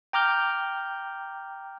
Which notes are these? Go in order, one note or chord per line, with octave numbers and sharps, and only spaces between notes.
G5 A#5 D6 F6 G6